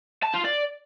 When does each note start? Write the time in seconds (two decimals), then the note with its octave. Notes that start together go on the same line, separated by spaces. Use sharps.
0.24 A5
0.34 F4
0.45 D5